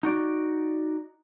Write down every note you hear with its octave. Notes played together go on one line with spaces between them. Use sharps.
D#4 F#4 D5